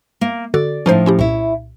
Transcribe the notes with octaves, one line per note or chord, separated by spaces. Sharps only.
A#3
D3 F#4 A4 D5
A2 F3 C#4 D#4 C5
C#4 E4 G4
C2 A#2 E4 C#5